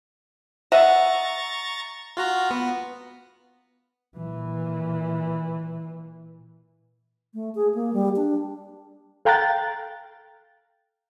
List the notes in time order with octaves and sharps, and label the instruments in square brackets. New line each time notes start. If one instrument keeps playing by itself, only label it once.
[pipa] D#5 E5 F#5 [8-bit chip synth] A#5 C#6 A6
[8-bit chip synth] F4 F#4 A#5
B3
[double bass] A#2 E3
[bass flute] A3
G#4
A#3
G3
D4
[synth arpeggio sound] A4 F5 G5 A#5 F#6 A6